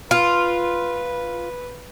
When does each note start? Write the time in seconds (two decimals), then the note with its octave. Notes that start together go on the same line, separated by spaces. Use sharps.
0.11 F4 B4